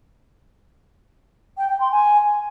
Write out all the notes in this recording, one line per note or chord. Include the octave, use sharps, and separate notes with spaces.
G5
G5
C6
G#5